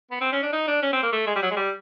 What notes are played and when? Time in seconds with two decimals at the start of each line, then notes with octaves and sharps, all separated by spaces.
0.11 B3
0.21 C4
0.32 C#4
0.43 D4
0.53 D#4
0.67 D4
0.82 C#4
0.93 C4
1.03 A#3
1.12 A3
1.27 G#3
1.36 G3
1.42 F#3
1.51 G#3
1.56 G3